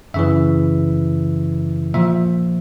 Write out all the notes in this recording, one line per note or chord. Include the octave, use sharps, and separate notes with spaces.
F#2 C#3 E3 E5
A#2 F3 E5